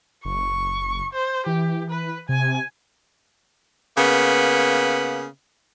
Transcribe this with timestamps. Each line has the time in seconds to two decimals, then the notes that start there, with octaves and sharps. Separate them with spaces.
0.25 F#1 C#6
1.13 C5
1.46 E3 G4
1.90 B4
2.29 C3 G#5
3.97 C#3 A#3 B3